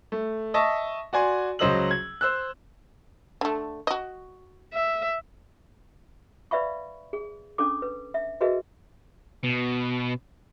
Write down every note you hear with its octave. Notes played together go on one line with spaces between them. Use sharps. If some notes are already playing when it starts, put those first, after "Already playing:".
A3
D#5 E5 A5 C#6
F#4 D5 G#5 C6
C#2 F#3 C5 D#5 E6 F#7
G#6
C5 E6 F#6
D3 A3
F#4 D#5
E5
B4 D5 E5 F5 B5 C#6
G#4
C#4 D4 A4 D6
B4
E5
F#4 G#4 A#4 B4 D#5 E5
B2